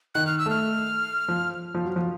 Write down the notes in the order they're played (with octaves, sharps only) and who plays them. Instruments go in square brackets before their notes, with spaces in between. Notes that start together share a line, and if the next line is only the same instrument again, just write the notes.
[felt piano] D#3 [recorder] F#6
[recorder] F6
E6
[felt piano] A3 [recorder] F6
[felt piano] F3
F3
F#3
F3